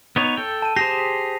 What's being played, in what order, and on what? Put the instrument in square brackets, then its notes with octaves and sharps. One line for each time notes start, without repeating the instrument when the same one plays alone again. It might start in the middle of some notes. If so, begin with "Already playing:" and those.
[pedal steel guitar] B3 D#4 C#5
A4 G5
[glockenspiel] A5 D#7
[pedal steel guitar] G4 G#4 C5 [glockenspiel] A#6 C7 F7
[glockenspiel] B6